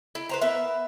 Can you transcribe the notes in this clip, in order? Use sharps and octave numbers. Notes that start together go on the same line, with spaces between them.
E4
B4 C5 A#5
B3 A#4 E5